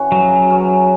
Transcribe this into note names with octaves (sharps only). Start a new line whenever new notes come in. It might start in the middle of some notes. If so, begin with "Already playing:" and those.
Already playing: E3 C#4 F#4
C#3 F#3
E3 C#4 F#4